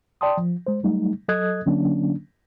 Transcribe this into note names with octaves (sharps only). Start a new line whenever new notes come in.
D5 G5 A5 C6 D#6
F3
G#3 C5
F#3 G3 A3 D#4
F#3 A4 D#5 D#6 F#6 G#6
D3 F#3 A#3 C#4 D4